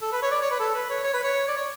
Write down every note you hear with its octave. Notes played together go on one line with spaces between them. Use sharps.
A4
B4
C#5
D5
C#5
B4
A4
B4
C#5
C#5
B4
C#5
D5
C#5